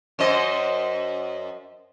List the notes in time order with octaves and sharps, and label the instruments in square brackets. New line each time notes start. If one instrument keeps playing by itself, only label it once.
[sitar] F#2 C5 D#5